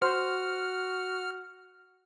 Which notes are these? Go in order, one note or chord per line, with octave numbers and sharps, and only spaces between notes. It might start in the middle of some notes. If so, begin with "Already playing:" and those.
F#4 C5 F6